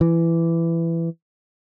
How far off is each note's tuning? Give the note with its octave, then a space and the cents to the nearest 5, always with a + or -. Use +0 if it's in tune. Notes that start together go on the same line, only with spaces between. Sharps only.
E3 +15